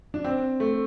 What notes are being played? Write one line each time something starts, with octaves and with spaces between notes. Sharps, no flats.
D4
C4
A3